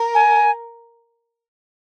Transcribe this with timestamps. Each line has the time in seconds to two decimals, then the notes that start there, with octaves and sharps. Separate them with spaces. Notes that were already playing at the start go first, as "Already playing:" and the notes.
Already playing: A#4
0.15 G#5